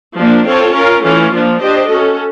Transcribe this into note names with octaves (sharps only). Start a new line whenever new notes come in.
F3 A#3 D4
C4 F4 A4 C#5
C#4 F4 A#4
E3 A3 C#4 F4
F3 A#3 D4
D4 G4 C5 D#5
C#4 F#4 A4